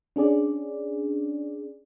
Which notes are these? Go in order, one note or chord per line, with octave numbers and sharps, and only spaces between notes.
C#4 D4 G#4 D5